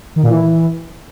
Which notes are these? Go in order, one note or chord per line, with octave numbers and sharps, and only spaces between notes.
D#3
A#2
E3